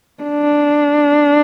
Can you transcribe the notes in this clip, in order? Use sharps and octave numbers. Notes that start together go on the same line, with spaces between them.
D4